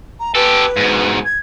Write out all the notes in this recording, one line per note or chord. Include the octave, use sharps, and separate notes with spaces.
A#5
G4 A4 B4
G#2 B2
G#6